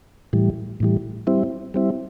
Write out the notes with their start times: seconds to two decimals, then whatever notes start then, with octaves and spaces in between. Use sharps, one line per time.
0.33 A2 E3 G3
0.80 A2 E3 G3
1.27 G3 C4 E4
1.74 G3 C4 E4